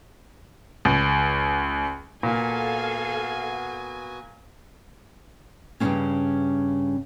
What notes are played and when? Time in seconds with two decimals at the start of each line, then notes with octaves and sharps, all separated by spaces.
0.85 C#2
2.23 A#2 B3 F#4 A4 F5 G#5
5.80 G2 C#3 F#3 G3 C4 C#4